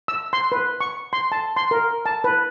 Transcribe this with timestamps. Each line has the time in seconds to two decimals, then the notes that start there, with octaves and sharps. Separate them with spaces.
0.08 E6
0.33 C6
0.52 B4
0.81 C#6
1.13 C6
1.32 A5
1.57 C6
1.71 A#4
2.06 A5
2.24 B4